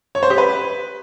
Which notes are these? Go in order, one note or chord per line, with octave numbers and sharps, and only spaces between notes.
C#5
C5
G4
B4